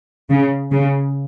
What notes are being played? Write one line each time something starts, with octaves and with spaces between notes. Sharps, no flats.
C#3
C#3